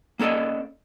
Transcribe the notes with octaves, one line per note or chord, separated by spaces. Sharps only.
A#3 C#4 A4 D5 D#5